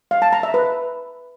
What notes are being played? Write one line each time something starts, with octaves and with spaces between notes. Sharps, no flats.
F5
A5
A#5
E5
B4